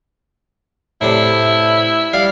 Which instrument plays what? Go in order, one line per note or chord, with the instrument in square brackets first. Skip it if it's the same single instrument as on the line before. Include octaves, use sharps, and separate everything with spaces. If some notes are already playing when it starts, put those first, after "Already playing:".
[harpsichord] A2 C3 D4 [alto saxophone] E4
[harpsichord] G3 D5 [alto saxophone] F5